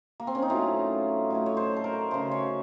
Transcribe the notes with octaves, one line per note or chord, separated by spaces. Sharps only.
A#3
C4
C#4
D#4
A2 F#3 A3 F4
A2 F#3 A3
C#5
C5
A4
A#4
C#3 A3 C5
C#5